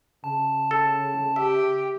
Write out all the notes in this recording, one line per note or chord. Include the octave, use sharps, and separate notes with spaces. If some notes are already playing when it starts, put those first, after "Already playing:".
C#3 A5
A4
G4 E5